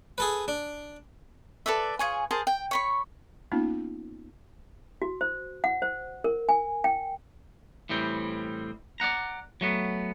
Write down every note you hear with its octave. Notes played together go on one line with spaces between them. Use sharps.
G#4 A4 B4
D4
A4 B4 D5 E5
F4 G#4 C#5 G#5
G#4 A#4 C5 A5
G5
C#5 B5 C#6
A#3 B3 C#4 D#4 F4
F#4
C5
F#5
C5
A#4
G#5
G5
A2 E3 G3 C4
D5 D#5 F#5 A#5
F#3 A3 B3